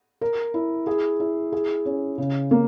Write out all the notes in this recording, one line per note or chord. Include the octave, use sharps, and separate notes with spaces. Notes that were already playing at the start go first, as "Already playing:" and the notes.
A#4
E4
G#4
E4
G#4
C#4
C#3
A#3